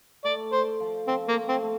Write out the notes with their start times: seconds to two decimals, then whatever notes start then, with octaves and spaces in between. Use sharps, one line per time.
0.24 A3 D5
0.52 A3 C5
0.80 F3
1.07 F3 C4
1.28 A#3
1.35 A3
1.49 C4
1.63 A3